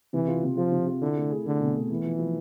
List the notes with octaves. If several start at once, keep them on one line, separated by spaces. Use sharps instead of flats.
C3 E3
F4
C3
F3 F4
C3
F4
D3 E4
A3
G#4
D3 A3
B2
A3
E3 B3
F3
F3